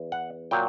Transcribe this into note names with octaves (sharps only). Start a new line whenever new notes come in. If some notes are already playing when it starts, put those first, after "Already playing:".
Already playing: E2
F#5
A#2 F#3 G5